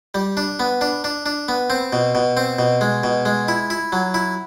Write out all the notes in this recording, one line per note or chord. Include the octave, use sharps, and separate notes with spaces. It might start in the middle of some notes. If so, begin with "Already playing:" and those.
G3
D4
B3
D4
D4
D4
B3
C4
B2
B2
C4
B2
G#3
B2
G#3
E4
E4
F#3
E4